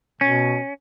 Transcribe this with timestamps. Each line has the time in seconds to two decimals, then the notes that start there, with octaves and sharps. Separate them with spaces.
0.21 B2 C#4